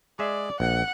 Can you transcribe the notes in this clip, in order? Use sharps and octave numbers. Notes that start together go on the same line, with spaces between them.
G#3 G#4 D5 E5
A#1 F#5